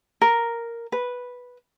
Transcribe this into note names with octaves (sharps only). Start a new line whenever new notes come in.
A#4
B4